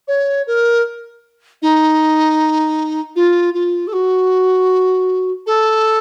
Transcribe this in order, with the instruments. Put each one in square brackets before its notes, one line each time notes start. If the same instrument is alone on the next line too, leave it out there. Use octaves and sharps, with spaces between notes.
[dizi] C#5
A#4
D#4
F4
F4
A4
F#4
A4